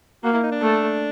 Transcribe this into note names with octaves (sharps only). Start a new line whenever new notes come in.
A#3 F#4
E4
D#4
D4
A3